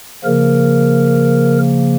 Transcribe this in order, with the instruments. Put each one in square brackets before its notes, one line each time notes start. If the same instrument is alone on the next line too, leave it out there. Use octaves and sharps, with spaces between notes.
[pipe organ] C#3 F3 A#3 A#4